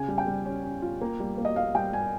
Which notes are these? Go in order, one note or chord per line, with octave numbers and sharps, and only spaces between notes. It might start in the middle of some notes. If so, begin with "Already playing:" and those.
Already playing: C#3 G#5
G3
G5
G3
C#4
C#4
F4
A#3
G3
A#3
D#5
A#3 F5
G3 G5
G3 G#5